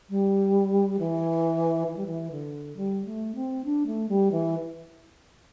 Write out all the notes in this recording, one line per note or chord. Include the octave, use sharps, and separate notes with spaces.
G3
E3
E3
G3
E3
D3
G3
A3
C4
D4
A3
G3
E3